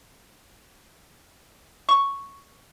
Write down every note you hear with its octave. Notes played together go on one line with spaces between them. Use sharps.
C#6